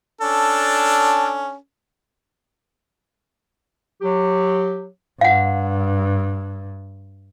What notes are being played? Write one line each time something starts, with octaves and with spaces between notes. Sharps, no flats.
C#4 D4 A4
F#3 G4
G2 F5 F#5